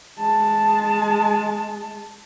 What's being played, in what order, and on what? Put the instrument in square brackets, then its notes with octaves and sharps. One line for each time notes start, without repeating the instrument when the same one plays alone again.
[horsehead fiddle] G#3 A5